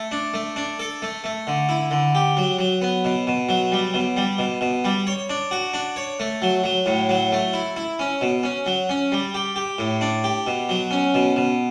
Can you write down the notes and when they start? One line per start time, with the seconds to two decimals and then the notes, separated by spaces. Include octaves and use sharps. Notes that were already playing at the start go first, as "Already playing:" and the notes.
Already playing: A3
0.11 D4
0.34 A3
0.56 D4
0.80 A4
1.02 A3
1.24 A3
1.47 D3
1.69 E4
1.91 D3
2.15 G4
2.37 F#3
2.59 F#3
2.82 B3
3.05 B2
3.27 B2
3.49 F#3
3.72 G3
3.94 B2
4.17 G3
4.38 B2
4.61 B2
4.84 G3
5.07 C#5
5.30 D4
5.51 F#4
5.74 D4
5.96 C#5
6.20 A3
6.42 F#3
6.64 F#3
6.86 A2
7.09 F#3
7.32 A3
7.53 E4
7.76 E4
7.99 C#4
8.21 B2
8.43 C#4
8.66 F#3
8.89 C#4
9.12 G3
9.34 G4
9.56 G4
9.78 A2
10.01 D4
10.24 G4
10.47 B2
10.69 F#3
10.91 C#4
11.14 B2
11.36 B2